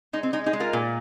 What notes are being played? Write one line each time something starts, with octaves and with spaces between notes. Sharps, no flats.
G#3 D#4
C4
G#3 D#4
D#4 G#4
G#3
F4 A#4
A#2